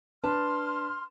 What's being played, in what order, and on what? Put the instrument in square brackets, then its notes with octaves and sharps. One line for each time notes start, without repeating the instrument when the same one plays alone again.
[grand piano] D4 B4 A5 [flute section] C6 F6